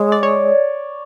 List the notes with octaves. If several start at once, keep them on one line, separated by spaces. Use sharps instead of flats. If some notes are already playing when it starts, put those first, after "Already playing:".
Already playing: G#3 C#5
D5
C#5